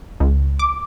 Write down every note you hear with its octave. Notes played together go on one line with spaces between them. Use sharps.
C#2
D6